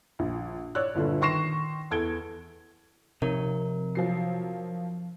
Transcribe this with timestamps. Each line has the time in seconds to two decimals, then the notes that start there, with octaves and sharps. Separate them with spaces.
0.19 A#1
0.75 C#5 D5 E6 F#6
0.95 G1 A#2 D3
1.21 D#3 C6 C#6 A#6 C7 E7
1.91 E2 A4 G#6 D7 G7
3.22 F2 C3 D#4 A#4 C#5
3.95 F3 F#3 C7